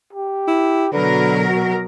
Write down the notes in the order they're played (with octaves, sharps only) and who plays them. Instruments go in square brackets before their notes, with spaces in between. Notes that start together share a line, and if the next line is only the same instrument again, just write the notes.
[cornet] G4
[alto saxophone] E4
[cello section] B2 F#3 A#4 [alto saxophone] D3 [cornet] B4
[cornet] F#4